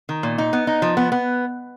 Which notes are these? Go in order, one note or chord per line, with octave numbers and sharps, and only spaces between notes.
D#3
A#2
D#4
B3
D#4
F3
B3
B3